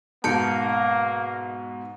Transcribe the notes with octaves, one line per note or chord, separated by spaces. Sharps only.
G#2 B2 A#3 A5 G6 C#7